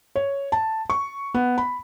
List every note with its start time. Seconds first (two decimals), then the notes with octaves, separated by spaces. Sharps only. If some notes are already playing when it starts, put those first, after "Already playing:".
0.16 C#5
0.52 A5
0.90 C#6
1.34 B3
1.58 B5